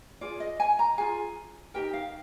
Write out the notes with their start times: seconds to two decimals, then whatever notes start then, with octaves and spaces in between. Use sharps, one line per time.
0.21 F4 G#4 D5
0.40 D#5
0.60 G#5
0.79 A#5
0.98 F4 G#4 G#5
1.74 D#4 G4 A#4 G5
1.93 F5